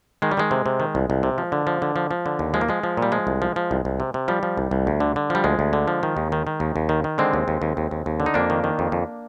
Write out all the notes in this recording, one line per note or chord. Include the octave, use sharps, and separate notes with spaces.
D#3 G#3
G3
D#3 G#3
C3
C3
D#3
C2
C2
C3
F3
D3
F3
D3
F3
F3
D3
D#2
F3 G#3
A#3
F3 G#3
F3
A#2
G3
F3 G#3
C2
F3
F3
C2
C2
C3
C3
F3 G3
F3
C2
C2
D2
D3
D3
F3 G3
D2 G#3
D2
D3
F3
D#3
D#2
D#3
D#3
D#2
D#2
D#3
D#3
D3 G#3 C4
D#2
D#2
D#2
D#2
D#2
D#2
D3
D#4
F2 A#3 D4
D#3
D#3
F2
F2